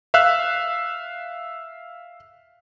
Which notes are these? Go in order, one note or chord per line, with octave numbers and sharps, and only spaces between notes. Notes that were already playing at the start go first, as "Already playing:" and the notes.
E5 F5 E6 F#6